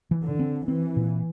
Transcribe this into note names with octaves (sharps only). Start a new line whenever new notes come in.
E3
D3
C4
E3 C4
A#2